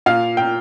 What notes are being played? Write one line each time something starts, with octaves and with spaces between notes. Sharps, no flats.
A#2 F5
G5